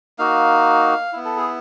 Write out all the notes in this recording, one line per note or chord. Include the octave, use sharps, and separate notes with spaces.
A#3 D#4 F#4 F5
B3 E4
A4
G#4